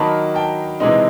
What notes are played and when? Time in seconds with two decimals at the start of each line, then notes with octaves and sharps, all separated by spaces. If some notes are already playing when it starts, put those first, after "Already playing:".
Already playing: D#3 F#3 A#3 D#4 A5 B5
0.35 G5 A5
0.80 C3 E3 G#3 C4 D#4